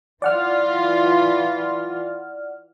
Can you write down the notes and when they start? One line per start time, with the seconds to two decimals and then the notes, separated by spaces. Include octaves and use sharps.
0.22 E3 F4 D5 F#5 F6